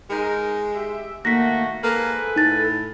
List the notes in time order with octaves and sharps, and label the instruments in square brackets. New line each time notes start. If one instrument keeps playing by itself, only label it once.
[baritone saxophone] G#3 [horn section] D#4 A#4
[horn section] G4 E5
[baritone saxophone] D#3 [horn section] A3 F#4 [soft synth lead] A#3 [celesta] A#6 B6
[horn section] G#2 B4 G#5 [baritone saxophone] A#3 [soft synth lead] A4
[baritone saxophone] A2 [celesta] D#4 A6